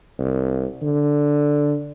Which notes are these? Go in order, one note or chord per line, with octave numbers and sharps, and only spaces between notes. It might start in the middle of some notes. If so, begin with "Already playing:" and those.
C2
D3